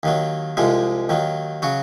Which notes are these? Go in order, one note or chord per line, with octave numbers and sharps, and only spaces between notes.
D#2 D#3 F#3
C2 C3 F3 G#3
D#2 D#3 F#3
C#3 F#3 F#4